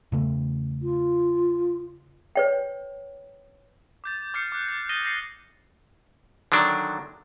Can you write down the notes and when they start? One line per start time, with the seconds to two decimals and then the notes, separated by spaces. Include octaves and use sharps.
0.12 E2 C#3 A3
0.82 F4
2.36 B4 C#5 G5
4.04 D6 G6 A6
4.34 D6 F6 G6 A6 C7 C#7
4.52 D6 F#6
4.69 A6
4.89 D#6 F#6 A6 A#6 D#7 G7
5.03 G6 A6 A#6 C7 C#7
6.52 D3 D#3 F#3 D4